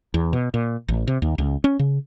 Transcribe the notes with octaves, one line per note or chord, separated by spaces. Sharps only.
E2
B2
A#2
A1
C3
D#2
C#2
C#4
C#3